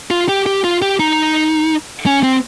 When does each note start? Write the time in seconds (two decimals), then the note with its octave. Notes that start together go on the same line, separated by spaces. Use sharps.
0.11 F4
0.29 G4
0.46 G4
0.64 F4
0.82 G4
1.00 D#4
2.06 C#4
2.23 C4